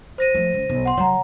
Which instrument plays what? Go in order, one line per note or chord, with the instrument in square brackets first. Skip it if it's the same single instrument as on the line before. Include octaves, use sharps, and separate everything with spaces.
[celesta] C5 A#6 D#7
[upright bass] F3 A3
C#2
B1
[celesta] F#5 C6
[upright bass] C#3 F#3 [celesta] C#5 F#5 A#5